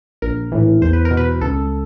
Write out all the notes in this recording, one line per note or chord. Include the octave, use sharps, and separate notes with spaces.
A#1 A#4
A2 E3
E2 C5
B4
A#4
B2
B4
C#2 A4